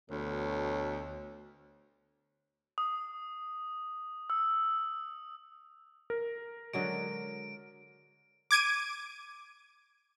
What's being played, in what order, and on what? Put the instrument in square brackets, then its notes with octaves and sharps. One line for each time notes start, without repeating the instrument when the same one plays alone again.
[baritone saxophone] D2 [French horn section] B2 A4 C#5
[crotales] D#6
E6
[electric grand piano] A#4
[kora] D3 F#3 G#3 [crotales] D7
[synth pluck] D6 G#6 D7 D#7